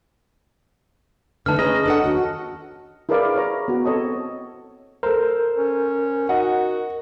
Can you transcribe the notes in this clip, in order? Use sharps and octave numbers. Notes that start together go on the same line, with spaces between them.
D3 A3 D#4 B4 A5 F6
C#4 G#4 B4 D#5 A#5
D4 A4 F#5
D#2 F#4
E4 G#4 A#4 B4 D5 F5
E4 C#5 A#5
B3 F#4
C4 A4 C#5 D#5 A5
A4 A#4 C5
C#4
D#4 F#4 D#5 F#5